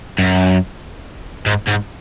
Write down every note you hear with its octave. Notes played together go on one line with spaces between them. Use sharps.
F#2
G#2
G#2